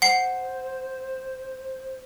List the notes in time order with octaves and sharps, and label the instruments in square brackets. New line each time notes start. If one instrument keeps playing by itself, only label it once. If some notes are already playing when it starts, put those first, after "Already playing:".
[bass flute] C5 [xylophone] F#5 C7